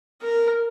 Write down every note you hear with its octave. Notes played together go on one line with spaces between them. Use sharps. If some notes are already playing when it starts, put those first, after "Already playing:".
A#4